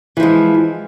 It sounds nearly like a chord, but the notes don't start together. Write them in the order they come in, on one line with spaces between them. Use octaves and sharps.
E3 F3 G#3